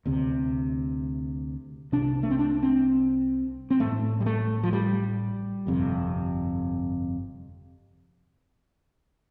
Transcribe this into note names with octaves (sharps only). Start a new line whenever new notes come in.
D2 C3
C2 C3 D4
A3
C4
D4
C4
C4
A1 A2 A3
G3
A3
F3
G3
G1 F2 C3